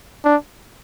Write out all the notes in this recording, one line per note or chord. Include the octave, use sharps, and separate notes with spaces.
D4